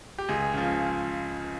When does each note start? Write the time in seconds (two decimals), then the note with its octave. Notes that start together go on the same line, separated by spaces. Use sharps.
0.18 G4
0.29 C#2 G#4
0.54 C#3 F3